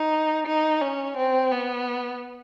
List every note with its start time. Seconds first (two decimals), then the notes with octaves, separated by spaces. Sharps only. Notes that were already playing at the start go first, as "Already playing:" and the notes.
Already playing: D#4
0.47 D#4
0.81 C#4
1.17 C4
1.51 B3